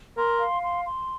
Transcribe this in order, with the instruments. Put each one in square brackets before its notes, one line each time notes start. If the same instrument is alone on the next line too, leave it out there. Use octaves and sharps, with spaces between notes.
[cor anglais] A#4 [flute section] C6
[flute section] F5
C6
C6